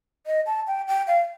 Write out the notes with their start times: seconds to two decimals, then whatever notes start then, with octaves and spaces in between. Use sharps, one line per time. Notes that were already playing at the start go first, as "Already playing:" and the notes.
0.27 D#5
0.46 A5
0.67 G5
0.88 G5
1.07 F5